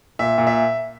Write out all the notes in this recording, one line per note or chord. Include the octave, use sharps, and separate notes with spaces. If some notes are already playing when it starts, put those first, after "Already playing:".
A#2 E5
A#2
E5